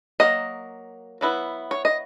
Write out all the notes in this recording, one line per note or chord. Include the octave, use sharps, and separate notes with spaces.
F#3 A#3 D#5
F#3 B3 E4
C#5
D#5